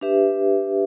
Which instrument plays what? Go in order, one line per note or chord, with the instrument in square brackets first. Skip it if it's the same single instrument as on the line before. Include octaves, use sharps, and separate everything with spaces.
[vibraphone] D4 G4 B4 E5